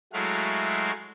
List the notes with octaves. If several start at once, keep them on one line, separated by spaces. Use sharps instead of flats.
F#3 G#3 A3 E4 F#4 F5